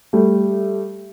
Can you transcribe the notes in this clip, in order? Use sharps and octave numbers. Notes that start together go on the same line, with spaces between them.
G3 A3